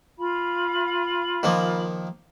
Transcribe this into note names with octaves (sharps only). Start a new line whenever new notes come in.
F4 F5 B5
D#3 F3 A#3